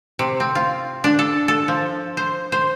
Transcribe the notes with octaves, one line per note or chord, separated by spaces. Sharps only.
C3
C4
F4
D4
A4
A4
F3
C5
C5